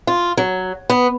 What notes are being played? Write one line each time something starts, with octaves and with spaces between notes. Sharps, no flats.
F4
F#3
B3